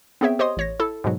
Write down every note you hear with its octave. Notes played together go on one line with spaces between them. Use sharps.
B3 C4 G#4 C#5 E5 G5
G4 C5 C#5 D#5 C6 D#6
A1 C#5 A#6
E4 A4
G#2 B2 F#3